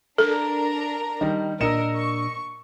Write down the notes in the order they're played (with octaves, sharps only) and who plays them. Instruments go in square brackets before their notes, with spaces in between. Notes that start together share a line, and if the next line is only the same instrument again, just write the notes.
[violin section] D4 A#4 A#5 [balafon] A4
[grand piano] D#3 G3 [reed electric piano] D#5
[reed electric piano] A#2 D4 E6 [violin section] A#4 [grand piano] D#5 C#7 E7
[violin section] C#6